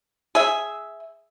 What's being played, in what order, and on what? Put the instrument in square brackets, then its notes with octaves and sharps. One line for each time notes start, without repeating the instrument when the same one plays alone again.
[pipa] G#4 E5